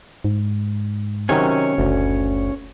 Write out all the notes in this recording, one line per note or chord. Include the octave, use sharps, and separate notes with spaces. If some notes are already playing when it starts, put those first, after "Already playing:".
G#2
C3 D#3 F#3 C#4 C#5 G#5
F#1 D2